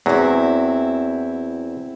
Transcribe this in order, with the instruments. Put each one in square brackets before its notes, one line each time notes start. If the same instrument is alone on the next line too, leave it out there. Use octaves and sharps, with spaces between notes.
[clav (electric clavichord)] E2 F#3 [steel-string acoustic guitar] C4 E4